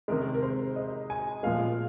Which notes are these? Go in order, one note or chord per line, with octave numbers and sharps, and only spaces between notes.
C3 D#3 G#3 A#4
A#4
C5
D#5
G#5
A#2 F3 G#3 F5